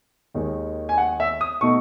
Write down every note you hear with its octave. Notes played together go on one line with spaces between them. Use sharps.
D#2 D#3 G#3
G#5
F#5
E5
D#6
B2 A3 D#4 C#6